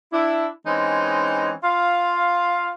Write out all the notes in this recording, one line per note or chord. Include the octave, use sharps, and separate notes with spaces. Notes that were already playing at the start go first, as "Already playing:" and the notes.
D4 E4
E3 G#3 C4 C#4 D#4
F4 F5